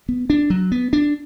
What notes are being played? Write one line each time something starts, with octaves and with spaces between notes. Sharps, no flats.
B3
D4
F#3
B3
D4